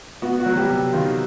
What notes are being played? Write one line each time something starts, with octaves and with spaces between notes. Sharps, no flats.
B3 F#4
F#4
F#3
G3 G4
C3
D#3 F4